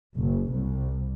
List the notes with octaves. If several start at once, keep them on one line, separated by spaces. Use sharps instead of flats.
F#1
C2